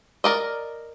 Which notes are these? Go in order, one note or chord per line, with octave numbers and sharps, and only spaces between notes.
A#4 D5 D#5